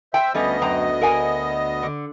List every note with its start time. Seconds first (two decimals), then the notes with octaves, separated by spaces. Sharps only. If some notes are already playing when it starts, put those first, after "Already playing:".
0.14 C5 E5 G5
0.34 D2 G3 A3 B3 C#4 D#5
0.62 F#2 G5 A#5
1.01 A#4 F#5 G#5
1.83 D3